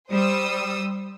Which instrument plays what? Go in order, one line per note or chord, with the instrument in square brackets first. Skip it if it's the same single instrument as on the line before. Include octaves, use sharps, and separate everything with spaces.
[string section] G3 C5 D#6 E6